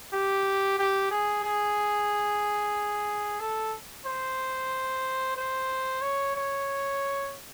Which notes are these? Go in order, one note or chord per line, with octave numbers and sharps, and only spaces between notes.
G4
G4
G#4
G#4
A4
C5
C5
C#5
C#5